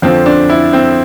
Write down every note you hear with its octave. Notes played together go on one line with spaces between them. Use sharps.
F2 D3 F3 C4
D4
E4
C4